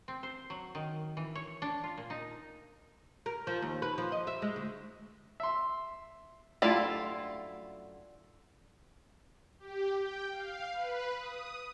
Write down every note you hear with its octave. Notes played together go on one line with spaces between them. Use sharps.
C4
C5
F#3
D#3
E3
C#5
D4
F4
A#2
D#4
A#4
F3
D#2
B4
F3
D#5
E5
G#3
D2
E5 C6
F#2 D3 G3 A3 E4 F4 D5
G4
G5
F5
B4
D#6